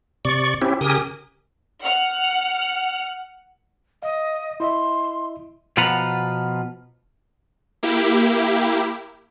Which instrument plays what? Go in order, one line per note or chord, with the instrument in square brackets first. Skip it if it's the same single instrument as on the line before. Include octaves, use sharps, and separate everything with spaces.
[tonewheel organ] C3 D5 C#6
C4 C#4 E4 G4
C#3 G4 A#4 G#5 D#6
[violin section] F#5 F6
[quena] D#5 [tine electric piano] F5
[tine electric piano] E4 D#5 E5 [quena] C6
[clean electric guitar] B2 F3 F4 B4 F#5 A#5
[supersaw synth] A#3 E4 G4